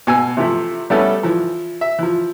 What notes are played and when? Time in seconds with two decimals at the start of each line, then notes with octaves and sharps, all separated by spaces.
0.07 B2 G#5 E6
0.37 C3 E3 F3 A3 E4
0.90 G3 A3 B3 C#4 E4 A4
1.23 E3 F3
1.81 E5
1.99 E3 F3